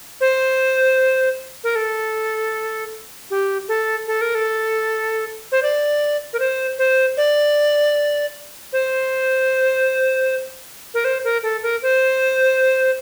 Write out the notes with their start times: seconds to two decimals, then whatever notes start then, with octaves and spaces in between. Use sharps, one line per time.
0.21 C5
1.64 A#4
1.76 A4
3.30 G4
3.69 A4
4.07 A4
4.21 A#4
4.35 A4
5.52 C5
5.63 D5
6.33 A#4
6.40 C5
6.79 C5
7.17 D5
8.73 C5
10.94 A#4
11.05 C5
11.24 A#4
11.43 A4
11.63 A#4
11.82 C5